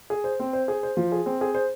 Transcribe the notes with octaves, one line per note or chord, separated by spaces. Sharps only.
G#4
C5
C4
C5
G#4
C5
F3
G#4
C4
G#4
C5